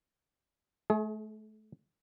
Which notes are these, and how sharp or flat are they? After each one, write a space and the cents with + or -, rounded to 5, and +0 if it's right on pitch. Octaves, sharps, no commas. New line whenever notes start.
A3 -30 G#4 +30